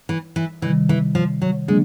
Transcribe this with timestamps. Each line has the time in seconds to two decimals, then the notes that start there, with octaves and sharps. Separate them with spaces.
0.09 E3
0.36 E3
0.62 C3 D#3 E3 G3
0.89 E3
1.15 F3
1.42 F#3
1.68 D3 F#3 G#3 A#3 D4